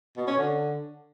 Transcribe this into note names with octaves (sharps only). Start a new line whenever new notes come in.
B2
C#4
D3